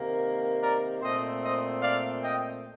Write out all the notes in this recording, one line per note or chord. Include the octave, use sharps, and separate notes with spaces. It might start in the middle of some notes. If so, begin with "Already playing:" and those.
Already playing: C3 D#3 A#3
A#4 D5
A#2 A3 C4 C5 D#5
C5 D#5
D5 F5
D#5 G5